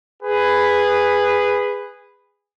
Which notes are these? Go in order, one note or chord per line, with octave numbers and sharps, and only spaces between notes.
G#4 B4